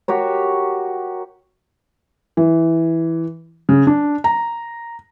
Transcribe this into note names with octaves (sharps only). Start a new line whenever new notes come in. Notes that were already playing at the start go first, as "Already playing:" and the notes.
F#4 G4 A#4 C#5
E3
C#3
D4
A#5